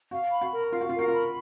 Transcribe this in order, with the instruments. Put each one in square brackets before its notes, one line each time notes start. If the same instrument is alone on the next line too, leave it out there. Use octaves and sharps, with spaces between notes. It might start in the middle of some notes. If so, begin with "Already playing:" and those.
[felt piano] F#4 [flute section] F5
[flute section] B5
[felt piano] F#4
[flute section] A#4
[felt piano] F4 [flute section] F5
[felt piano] F#4
[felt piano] F4 [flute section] A#4
[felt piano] F#4
[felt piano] F4 [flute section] B5